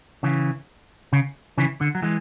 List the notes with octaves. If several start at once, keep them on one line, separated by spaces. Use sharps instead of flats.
C#3 E3
C#3
C#3 E3
D3
F#3
E3 G#3